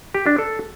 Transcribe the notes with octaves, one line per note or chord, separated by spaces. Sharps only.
G4
D4
A4